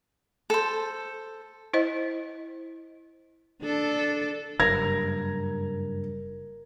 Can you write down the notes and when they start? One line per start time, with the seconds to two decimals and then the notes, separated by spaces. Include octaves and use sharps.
0.50 A4 C5
1.73 E4 C5 D#5
3.62 D4 A4
4.60 F#1 G2 A#4 G#6